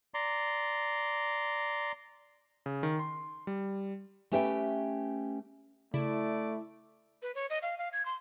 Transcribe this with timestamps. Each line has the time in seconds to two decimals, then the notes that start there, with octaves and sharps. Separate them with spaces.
0.14 D5 A#5 C6
2.66 C#3
2.83 D#3
2.99 C6
3.47 G3
4.31 A3 C#4 G4 B4 E5 G5
5.94 C#3 A3 E4 D5
7.22 B4
7.35 C#5
7.50 D#5
7.62 F5
7.78 F5
7.93 G#6
8.05 C6